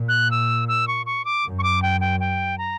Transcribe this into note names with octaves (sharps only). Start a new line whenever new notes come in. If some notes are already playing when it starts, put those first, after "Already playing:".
Already playing: A#2
F#6
E6
E6
C#6
C#6
D6
F#2
C#6
D6
G5
G5
G5
A#5